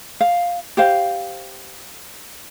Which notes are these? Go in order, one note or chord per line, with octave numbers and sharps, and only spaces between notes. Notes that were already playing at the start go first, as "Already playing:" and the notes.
F5
G4 C5 F5